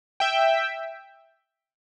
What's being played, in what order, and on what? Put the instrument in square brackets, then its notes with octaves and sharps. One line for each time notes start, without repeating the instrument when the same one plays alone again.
[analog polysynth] E5 G5